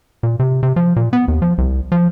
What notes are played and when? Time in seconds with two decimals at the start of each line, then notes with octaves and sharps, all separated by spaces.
0.23 A#2
0.39 C3
0.63 C3
0.76 F3
0.96 A#2
1.13 B3
1.28 D#2
1.42 F3
1.58 C2
1.92 F3